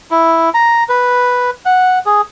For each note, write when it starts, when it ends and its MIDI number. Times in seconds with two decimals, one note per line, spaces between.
0.11 0.50 64
0.54 0.84 82
0.89 1.50 71
1.66 1.99 78
2.06 2.21 68